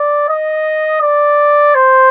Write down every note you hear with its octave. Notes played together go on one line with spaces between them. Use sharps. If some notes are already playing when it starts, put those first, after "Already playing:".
Already playing: D5
D#5
D5
C5